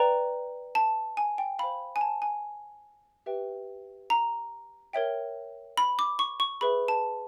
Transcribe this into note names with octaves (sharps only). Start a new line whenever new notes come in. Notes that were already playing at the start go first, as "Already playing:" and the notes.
Already playing: B4 D5 G5 A#5
A5
G#5
G5
C5 F5 B5
G#5
A5
G#5
G4 B4 E5 G5
A#5
A#4 C#5 E5 G5
B5
D6
C#6
C#6
G#4 B4 E5 B5
A5